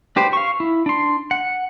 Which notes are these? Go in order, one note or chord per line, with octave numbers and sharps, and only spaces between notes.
D4 G4 B4 C5
F5 C#6
E4
D4 C6
F#5